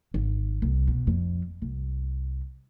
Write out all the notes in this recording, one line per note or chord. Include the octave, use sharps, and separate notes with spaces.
G#1
C2
B2
F2
C2